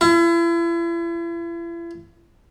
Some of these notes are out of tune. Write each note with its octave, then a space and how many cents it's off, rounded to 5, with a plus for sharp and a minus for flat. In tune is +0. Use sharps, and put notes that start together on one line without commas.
E4 +40